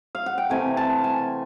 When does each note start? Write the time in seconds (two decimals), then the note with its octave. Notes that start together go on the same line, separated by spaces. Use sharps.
0.15 F5
0.26 F#5
0.38 G5
0.50 C3 E3 A3 C4 G#5
0.77 A5
1.04 G#5